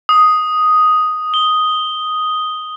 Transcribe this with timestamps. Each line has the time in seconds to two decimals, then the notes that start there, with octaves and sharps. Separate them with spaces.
0.09 D#6
1.34 G7